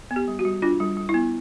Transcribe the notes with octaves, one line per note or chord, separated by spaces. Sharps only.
B3
G4
G3
F#4
G3
D4 F4
G3
G3
E4
B3